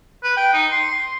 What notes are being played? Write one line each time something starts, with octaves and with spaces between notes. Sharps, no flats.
B4
G5
D#4
C6
C6